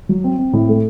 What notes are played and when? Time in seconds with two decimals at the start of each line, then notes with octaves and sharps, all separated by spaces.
0.09 F#3
0.24 C4
0.39 C4
0.53 A2
0.69 A3